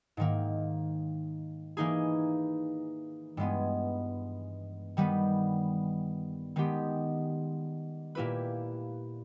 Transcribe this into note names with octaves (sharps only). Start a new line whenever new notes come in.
G#2 D#3 A#3
E3 A#3 D#4 G#4
G2 E3 G#3 B3
D#3 G3 B3
D#3 G#3 B3 G4
A#2 A#3 E4 G4 B4